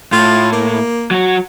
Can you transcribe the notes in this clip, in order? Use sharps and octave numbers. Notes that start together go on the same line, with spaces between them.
A2 F4
A#3
F#3 F#4